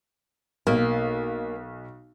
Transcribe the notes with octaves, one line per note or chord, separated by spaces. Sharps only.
B1 A#3